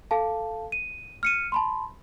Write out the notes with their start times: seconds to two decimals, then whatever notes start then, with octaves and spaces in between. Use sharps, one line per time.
0.11 A4 F5 A5
0.72 D#7
1.23 F6 C#7 D#7
1.52 A5 B5 C6